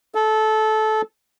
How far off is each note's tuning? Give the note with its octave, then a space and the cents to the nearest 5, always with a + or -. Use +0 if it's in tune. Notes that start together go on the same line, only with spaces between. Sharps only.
A4 -20